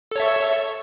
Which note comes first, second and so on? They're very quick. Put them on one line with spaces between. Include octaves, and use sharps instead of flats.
A4 C#5 E5